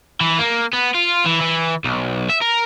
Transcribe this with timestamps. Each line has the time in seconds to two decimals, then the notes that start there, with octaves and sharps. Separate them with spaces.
0.21 E3
0.39 A#3
0.73 B3
0.94 F4
1.25 E3
1.41 E3
1.84 B1
2.30 E5
2.42 A#4